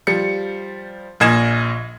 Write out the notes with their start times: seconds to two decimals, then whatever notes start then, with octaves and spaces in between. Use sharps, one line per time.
0.07 F3 G3 C#7
1.20 A#1 A#2 D#5 G#5 G#6 E7